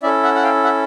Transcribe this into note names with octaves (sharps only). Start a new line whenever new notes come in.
C#4 E4 A4 D5 E5
E5 F#5
F#5
F5 G5
E5 F#5